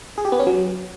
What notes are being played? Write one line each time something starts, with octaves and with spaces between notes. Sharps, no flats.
G#4
G4
B3
C#4
F#3